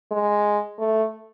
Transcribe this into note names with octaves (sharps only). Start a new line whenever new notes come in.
G#3
A3